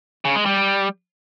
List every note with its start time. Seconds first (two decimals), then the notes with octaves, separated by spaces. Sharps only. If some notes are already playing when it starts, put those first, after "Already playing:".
0.25 C#3
0.35 G#3
0.46 G3